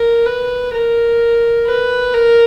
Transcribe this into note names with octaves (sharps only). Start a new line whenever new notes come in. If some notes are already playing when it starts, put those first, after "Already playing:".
Already playing: A#4
B4
A#4
B4
A#4